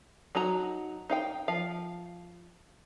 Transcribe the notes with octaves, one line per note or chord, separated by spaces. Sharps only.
F#3 D#4 F#4 A#5
D#4 F5 G5
F3 F5